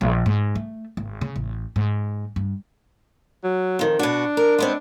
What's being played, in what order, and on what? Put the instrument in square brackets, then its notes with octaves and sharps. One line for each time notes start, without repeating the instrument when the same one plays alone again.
[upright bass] A#1
G#2
A3
G#1
C#3
A1
G#2
G2
[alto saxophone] F#3
[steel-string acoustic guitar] F2 D#3
[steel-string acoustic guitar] B2 F#4 [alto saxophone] D4
[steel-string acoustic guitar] A#4
G#3 B3 C4